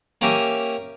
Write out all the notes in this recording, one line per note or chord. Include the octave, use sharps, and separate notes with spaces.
A#3 C#4 G4 A#4 E5 G#5